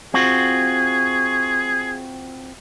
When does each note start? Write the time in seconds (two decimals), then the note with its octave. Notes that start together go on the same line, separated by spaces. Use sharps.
0.14 C4 F4 F#4 G#4